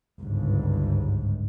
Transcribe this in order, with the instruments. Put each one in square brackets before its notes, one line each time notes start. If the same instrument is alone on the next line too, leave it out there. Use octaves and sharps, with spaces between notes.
[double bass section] G1 C#2 G#2